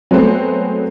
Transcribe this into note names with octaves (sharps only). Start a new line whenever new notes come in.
F#3 G#3 A3 B3 C4